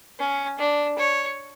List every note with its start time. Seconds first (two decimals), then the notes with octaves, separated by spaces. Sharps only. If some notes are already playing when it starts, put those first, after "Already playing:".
0.19 C#4
0.59 D4
0.98 C#5